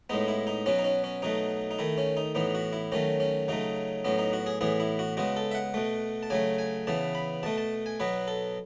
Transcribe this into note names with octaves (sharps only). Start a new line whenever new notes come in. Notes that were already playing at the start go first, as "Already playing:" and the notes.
A2 G#3 B3 D#4
E4
D#4
B2 F#3 B3 C#4
D#4
C#4
C#4
B2 F#3 A3 D#4
D#4
D#3 A3 E4
C#4
D#4
A2 E3 B3 D#4
F#4
E4
D#3 F#3 A3 C#4
C#4
C#3 F#3 A3 D#4
A2 F#3 B3 C#4
D#4
F#4
G#4
A2 E3 B3 G#4
E4
F#4
C#3 G#3 B3 F#4
A4
E5
F#5
B2 A3
A5
C#3 F#3 A3 G#5
G#5
C#3 E3 B3 A5
B5
B2 A3 A5
A5
G#5
B2 F#3 B3 B4
A4